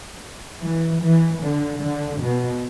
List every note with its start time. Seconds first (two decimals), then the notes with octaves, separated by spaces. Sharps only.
0.64 E3
1.03 E3
1.43 D3
1.83 D3
2.23 B2